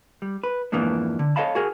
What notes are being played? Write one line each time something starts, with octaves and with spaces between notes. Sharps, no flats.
G3
B4
F2 G#2 E3 A#3 B3 D4
D3
A4 C#5 D#5 F5 A5 B5
F#4 G#4 A#4